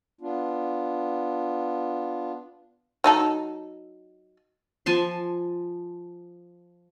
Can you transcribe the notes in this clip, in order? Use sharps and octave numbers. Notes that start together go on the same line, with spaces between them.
B3 D4 F4
F#3 D#4 A4
F3 G#5 A5 C6